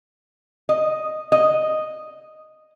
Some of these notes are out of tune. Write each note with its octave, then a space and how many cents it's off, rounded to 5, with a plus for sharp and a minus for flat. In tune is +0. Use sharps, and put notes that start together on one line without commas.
D#5 +0
D#5 -5